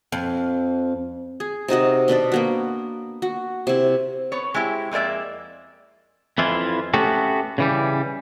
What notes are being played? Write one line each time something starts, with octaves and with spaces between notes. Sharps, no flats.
F2
G#4
C3 D#4 F#4 D#5
B2 D4 B4 D5
A#3 B3 F#4
F#4
C3 E4
B3 C#5
G#3 C4 E4 G4
F2 G#3 A#3 D5 E5
F2 E3 E4 F4
A3 B3 C#4 F#4 G4 A4
C#3 E3 G3